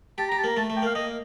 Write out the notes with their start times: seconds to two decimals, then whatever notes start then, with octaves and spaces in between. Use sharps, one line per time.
0.18 G4 A5
0.29 A#5
0.32 G4
0.38 A5
0.44 A#3 A#5
0.57 A3 A5
0.70 A3
0.77 G5
0.82 A#3 F5
0.95 A#3 D#5